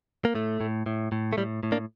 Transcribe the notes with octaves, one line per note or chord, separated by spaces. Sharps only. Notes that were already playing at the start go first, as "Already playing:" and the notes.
A#3
A2 A3
A2
A2
A2
A3
A2 G3
A2
A#3 D4